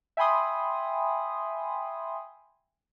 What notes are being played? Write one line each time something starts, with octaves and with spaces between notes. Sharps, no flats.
E5 G5 G#5 B5 C6 D#6